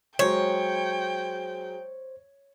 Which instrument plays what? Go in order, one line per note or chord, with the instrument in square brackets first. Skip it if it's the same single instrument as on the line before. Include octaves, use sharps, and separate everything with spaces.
[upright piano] F#3 G#3 F#4 [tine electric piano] C5 [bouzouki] C#5 [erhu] G5